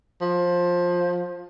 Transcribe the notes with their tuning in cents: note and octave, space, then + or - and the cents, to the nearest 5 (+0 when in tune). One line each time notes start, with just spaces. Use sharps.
F3 +15